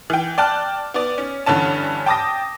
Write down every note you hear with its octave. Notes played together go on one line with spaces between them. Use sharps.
E3 G5
D5 G5 A5 F6 F#6
B3 D5
C#4
G2 D3 E3 C#4 A5
G5 A5 D6 D#6 A#6